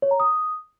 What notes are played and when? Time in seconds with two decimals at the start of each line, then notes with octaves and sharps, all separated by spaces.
0.02 C#5
0.11 A#5
0.20 D#6